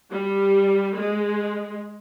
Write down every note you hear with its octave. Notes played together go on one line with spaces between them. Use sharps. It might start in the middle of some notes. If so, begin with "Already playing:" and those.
G3
G#3